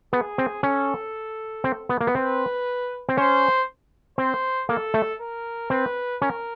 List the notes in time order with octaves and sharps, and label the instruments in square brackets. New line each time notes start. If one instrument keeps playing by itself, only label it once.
[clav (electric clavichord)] B3 [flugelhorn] G#4
[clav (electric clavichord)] C4
[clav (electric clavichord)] C#4 [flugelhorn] A4
[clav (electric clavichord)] C4
B3
A#3
B3
[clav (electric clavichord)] C4 [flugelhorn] B4
[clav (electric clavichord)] C4
[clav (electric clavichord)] C#4 [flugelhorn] C5
[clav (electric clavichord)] C4 [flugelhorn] C5
[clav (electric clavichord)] A#3 [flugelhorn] A4
[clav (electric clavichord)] A3
[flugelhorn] A#4
[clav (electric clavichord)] C4 [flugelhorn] B4
[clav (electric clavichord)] C#4 [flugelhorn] A#4